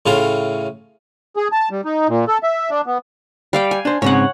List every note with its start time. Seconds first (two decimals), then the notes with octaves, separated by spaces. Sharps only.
0.06 A2 C#3 F4
1.36 G#4
1.52 A5
1.71 G3
1.85 D#4
2.08 A#2
2.28 A4
2.43 E5
2.70 D4
2.86 B3
3.53 G3 F5 G5
3.71 G#5
3.85 D4 C5
4.02 G#2 C#3 C4 C#5 F#5